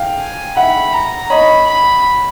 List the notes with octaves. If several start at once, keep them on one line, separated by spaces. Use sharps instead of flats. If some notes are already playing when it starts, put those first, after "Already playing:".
Already playing: F5 G5
G#5
E5 F#5 B5
A#5
C#5 D#5 B5
B5